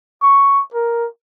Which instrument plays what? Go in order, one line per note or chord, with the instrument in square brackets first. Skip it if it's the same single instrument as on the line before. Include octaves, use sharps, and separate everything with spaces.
[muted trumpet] C#6
A#4